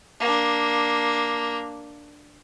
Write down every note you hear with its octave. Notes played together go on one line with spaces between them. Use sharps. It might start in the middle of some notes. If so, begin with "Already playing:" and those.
A#3 D4